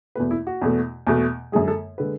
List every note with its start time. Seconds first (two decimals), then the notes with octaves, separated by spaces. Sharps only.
0.15 E2 B2 A3 B4
0.31 E4
0.47 F#4
0.62 E2 B2 A3
1.07 E2 B2 A3
1.52 F#2 D3 G#3 G#4
1.68 A4
1.98 D3 G#3 B4